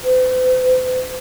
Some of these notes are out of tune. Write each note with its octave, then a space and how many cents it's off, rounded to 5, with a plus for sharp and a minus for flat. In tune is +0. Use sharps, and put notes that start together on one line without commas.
C5 -45